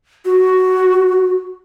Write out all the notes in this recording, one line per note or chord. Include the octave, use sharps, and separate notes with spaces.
F#4